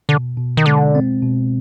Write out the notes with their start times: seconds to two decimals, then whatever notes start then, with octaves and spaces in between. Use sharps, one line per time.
0.09 B2 D3
0.37 B2
0.57 D#3
0.66 D3 G#3
0.95 C4
1.23 B2